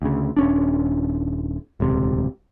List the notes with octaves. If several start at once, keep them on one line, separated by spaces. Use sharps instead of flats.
D2 C#3
D#1 C#4 D4
D#1 C#2 C3